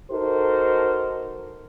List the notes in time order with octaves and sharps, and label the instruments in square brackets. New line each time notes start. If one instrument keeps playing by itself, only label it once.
[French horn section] D#4 F#4 A4 A#4 C5